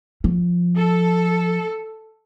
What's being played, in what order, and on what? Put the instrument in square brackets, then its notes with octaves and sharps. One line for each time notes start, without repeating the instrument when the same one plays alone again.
[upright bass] F3
[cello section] A4